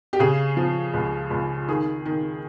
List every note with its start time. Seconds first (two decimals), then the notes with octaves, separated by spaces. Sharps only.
0.13 G4
0.20 C#3 G#4
0.57 F3
0.94 C#2
1.31 C#2
1.68 D#3 G#4
2.05 D#3